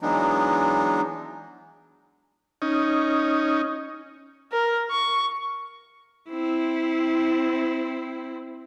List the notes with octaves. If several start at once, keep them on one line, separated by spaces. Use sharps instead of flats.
E3 F#3 G#3 B3 D4 D#4
C#4 D#4
A#4
C#6
C4 E4